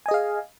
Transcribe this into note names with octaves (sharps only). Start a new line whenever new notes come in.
G#4 D#5 F5 G#5